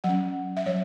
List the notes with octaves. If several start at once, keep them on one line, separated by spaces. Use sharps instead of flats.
F#3 C#4 F#5
E5
F#3 C#5